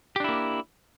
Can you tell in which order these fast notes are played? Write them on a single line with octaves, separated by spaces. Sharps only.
G4 D4 E4 A#3